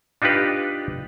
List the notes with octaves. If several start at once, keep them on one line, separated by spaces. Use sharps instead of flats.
D4 D#4 F4 G4 B4